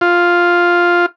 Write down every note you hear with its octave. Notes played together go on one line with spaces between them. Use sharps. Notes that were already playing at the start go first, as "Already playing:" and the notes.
F4